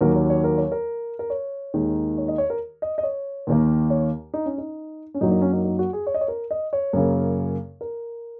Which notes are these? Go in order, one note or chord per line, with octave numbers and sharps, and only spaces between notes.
D#2 D#3 F#3 A#3 A#4
C#5
C#5
A#4
C#5
A#4
A#4
C#5
D#2 D#3 G#3
C#5
D#5
C#5
A#4
D#5
D#5
C#5
D#2 D#3 A#3
C#5
D#4
C#4
D#4
C#4
F#2 F#3 A#3 D#4
D#4
C#4
D#4
D#4
F#4
G#4
C#5
D#5
C#5
A#4
D#5
C#5
F#2 C#3 A#3
A#4